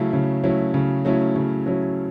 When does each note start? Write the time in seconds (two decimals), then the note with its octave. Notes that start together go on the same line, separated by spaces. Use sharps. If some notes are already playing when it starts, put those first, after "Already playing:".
Already playing: C#3 F#3 A3 C#4 E4
0.13 C#3
0.44 F#3 A3 C#4 E4
0.74 C#3
1.05 F#3 A3 C#4 E4
1.36 C#3
1.66 F#3 A3 C#4 E4